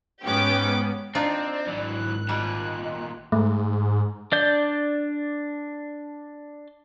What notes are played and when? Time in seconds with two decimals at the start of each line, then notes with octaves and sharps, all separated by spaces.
0.24 G#2 B3 C#4 G4 G5 D6
1.15 C4 D4 D#4 F4 D5
1.67 G#1 E3 F#3 F#6
2.29 D#2 A#2 G3 D#5
3.32 G#2 A3
4.32 D4 D5 G6